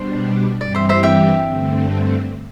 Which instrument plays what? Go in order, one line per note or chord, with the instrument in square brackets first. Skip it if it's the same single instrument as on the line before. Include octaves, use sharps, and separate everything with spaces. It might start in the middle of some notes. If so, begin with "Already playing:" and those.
Already playing: [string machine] B2 G3 D4 [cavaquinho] C5
[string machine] G2 E3 G3 C4 G4 [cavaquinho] D5
[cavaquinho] C5 E5
C5 E5
E5 G5
[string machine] G2 D3 A3 C4